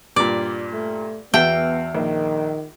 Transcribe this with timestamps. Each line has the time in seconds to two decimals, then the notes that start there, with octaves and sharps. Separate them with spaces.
0.16 G2 A#2 D5
0.73 A3
1.34 E2 B3 F#4 E5 G5 A5
1.95 A#1 D#3